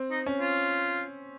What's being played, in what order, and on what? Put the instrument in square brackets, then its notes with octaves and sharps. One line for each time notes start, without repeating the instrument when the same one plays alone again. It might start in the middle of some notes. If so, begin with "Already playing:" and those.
Already playing: [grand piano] C4
[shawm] D#4
[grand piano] C#4
[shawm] F4